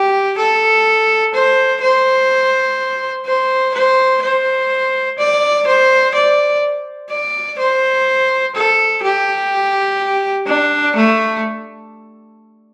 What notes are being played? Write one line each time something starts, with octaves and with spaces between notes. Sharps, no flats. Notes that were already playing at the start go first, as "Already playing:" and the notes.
Already playing: G4
A4
C5
C5
C5
C5
C5
D5
C5
D5
D5
C5
A4
G4
D4
A3